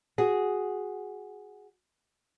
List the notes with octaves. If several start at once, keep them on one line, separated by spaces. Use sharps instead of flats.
F#4 G#4